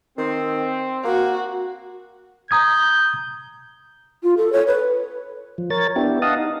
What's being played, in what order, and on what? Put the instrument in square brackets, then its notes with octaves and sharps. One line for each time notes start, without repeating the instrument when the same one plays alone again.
[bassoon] D#3 [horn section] C4
[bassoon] A#3 [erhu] F#4
[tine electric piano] A#5 D#6 G#6 [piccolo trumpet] G6
[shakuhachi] F4
A4
C#5
B4
[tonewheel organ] F3
A#4 C#5 A6
B3 D4 E4 G4
D#5 F5 F#5 A5 D#6
D#4